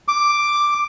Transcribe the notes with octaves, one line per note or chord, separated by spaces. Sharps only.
D6